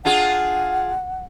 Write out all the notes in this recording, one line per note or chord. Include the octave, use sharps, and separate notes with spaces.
D4 F4 G#4 F#5